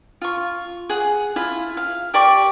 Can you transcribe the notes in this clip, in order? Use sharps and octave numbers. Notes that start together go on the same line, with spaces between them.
F4 C#6
G#4 F#5
E4 F4
F5
G4 D5 C#6 D6